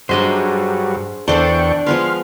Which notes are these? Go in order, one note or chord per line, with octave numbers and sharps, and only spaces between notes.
G2 F#3 D4 G#4 C5 D#5 E5
E2 D4 A4 C5 D5 G5 C#6
F3 G#3 B3 C6 F6